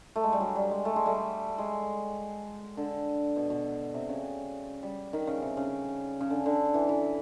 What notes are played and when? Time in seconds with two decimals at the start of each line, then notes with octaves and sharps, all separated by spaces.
0.16 A3
0.23 G#3
0.33 G3
0.40 F#3
0.56 G3
0.71 G#3
0.85 A3
0.96 G#3
1.06 G3 A3
1.58 G#3
2.77 D3
3.36 B2
3.50 B2
3.94 C3
4.09 C#3
4.83 G3
5.13 D#3
5.27 C#3
5.42 C3
5.57 C#3
6.21 C#3
6.30 D3
6.46 D3
6.74 E3
6.89 E3